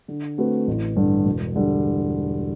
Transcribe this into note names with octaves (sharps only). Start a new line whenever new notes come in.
D3
A3 C4 F#4 B4
A1
G2 D3
E1
D3 G3